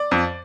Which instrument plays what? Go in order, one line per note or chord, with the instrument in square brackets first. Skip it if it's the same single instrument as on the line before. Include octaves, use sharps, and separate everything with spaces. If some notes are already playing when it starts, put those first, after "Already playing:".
Already playing: [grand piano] D5
F2